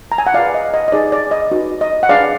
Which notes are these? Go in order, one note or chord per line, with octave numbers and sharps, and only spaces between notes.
A#5
G#5
F#5
F4 G#4 B4 D5 F5
D#5
D#5
D#5
D#4 G#4 B4 D5
D5
D#5
D#4 F#4 B4
D#5
F#5
D4 G#4 B4 D5 F5